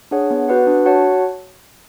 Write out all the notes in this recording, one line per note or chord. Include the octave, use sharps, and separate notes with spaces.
D4 G#4 C#5 F#5
B3
F#4 B4 D5 F#5
D4
F#4 C#5 F#5 A5